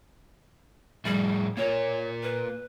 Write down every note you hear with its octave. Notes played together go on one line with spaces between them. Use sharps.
A2 F3 G3 G#4
A#3 F4 A#4 C#5
B4